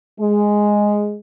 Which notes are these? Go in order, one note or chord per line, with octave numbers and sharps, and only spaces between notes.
G#3